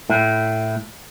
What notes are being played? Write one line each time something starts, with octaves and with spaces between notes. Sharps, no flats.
A2